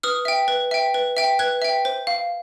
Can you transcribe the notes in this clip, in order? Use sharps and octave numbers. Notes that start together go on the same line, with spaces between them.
B4 D#6 F6
E5 G5
B4
E5 G5
B4
E5 G5
B4 F#6 G#6
E5 G5
C5
F5